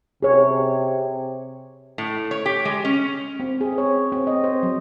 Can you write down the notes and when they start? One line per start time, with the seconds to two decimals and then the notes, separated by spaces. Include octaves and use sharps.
0.23 C3 G#4 C#5
1.98 A2
2.31 C#5
2.46 G4
2.65 G#3
2.85 C#4
3.40 C4
3.61 G#4
3.78 C#5
4.12 C4
4.27 D#5
4.44 C5
4.63 F#3